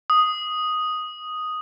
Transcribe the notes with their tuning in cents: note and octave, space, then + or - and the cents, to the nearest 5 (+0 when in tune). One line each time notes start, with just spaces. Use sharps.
D#6 +0